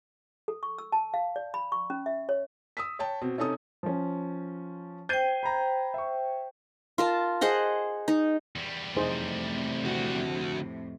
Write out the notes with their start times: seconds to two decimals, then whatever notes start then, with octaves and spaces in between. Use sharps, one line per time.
0.48 A4
0.63 C#6
0.78 E6
0.92 A5
1.14 F5
1.36 D5
1.54 B5
1.72 C#6
1.90 C#4
2.06 E5
2.29 C#5
2.77 D#6 E6 B6
2.99 C#5 G5 A5
3.22 B2 C4
3.38 C3 C#4 D#4 A4 D#6
3.83 F3 C#4
5.09 C5 G5 G6 G#6 D#7
5.43 A#5 B5
5.94 E5 C#6
6.98 F4 A#4 A5
7.41 G#4 C5 D#5 F#5
8.08 D#4
8.56 E2 G3
8.97 F2 A2 C3 D#4 G#4 C5
9.85 D3 F#4